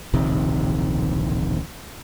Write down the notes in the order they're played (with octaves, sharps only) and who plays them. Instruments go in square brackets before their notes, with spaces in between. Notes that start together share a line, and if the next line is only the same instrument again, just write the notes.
[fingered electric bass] D1 A#1 C3 D#3